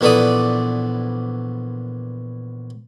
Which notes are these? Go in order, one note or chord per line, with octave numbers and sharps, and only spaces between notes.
A#1 E3 B3 A4 D5 D#6